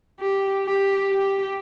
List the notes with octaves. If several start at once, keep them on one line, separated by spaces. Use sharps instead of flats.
G4
G4
G4